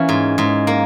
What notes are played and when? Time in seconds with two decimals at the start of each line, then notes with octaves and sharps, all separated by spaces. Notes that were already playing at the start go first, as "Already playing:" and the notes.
Already playing: E3 A#3 C#4
0.09 G#2
0.38 G#2
0.67 A#3